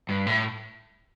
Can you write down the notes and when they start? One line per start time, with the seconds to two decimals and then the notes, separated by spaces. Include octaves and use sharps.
0.09 G2
0.27 A2